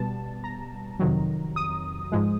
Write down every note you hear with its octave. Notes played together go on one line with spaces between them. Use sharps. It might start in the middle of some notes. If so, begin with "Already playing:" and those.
Already playing: B2 G3 B3 A5
A#5
F2 C3 D#3 F#3
D#6
G#2 F3 G#3